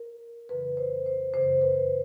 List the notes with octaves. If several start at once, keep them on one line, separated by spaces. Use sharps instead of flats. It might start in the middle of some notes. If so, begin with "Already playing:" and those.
Already playing: A#4
F2 C#3 E3 B4
C5
C5
F#2 C#3 E3 C5
B4